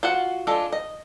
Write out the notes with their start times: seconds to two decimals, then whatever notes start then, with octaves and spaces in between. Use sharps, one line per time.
0.03 F4 F#4 F#5
0.47 G#3 D4 F4 A4
0.72 D#5